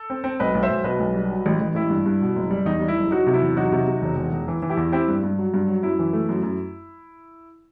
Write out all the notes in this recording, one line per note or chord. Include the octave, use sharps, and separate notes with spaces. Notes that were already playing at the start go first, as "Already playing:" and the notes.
Already playing: A4
C4
C4
B1 B4 D#5
B1
C5 E5
B1
B2 B4 D#5
B1
G3
F#3
A1
A1
A1 E4
G2
G2
B2
F#1
G3
E2 D#4
G3
E4
F#1
F#3 D#4 F#4
C3
E4
E2
F#3 D#4 F#4
C3
C3
E1
E1
E1
E3
E3
E4 G4
E2
C4 E4 G4
G2
G2
F#3
G2
F#3
F#2 E4
E3
A3
F#2
F#2